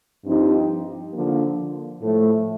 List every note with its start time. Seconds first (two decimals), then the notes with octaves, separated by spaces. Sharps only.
0.25 G2 F3 C4 D#4 G4
1.12 D3 F3 A#3
2.01 A2 F3 A3